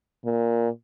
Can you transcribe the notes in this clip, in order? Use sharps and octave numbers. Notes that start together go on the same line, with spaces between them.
A#2